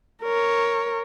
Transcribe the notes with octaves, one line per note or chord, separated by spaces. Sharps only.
A#4 C#5